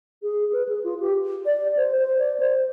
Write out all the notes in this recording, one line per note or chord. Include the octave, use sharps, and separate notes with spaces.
G#4
B4
G#4
F4
G4
D5
C5
C5
D5
C5